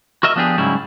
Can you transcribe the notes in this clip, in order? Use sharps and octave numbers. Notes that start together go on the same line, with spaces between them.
F#4 A#4 D#5 E5
F3 B3 D4 G4 G#4
G#2 C#3 F#3 G3 E4